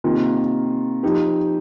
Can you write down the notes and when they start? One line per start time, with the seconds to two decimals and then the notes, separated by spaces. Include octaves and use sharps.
0.04 C3 D#3 A#3 F4
1.03 F3 D#4 G4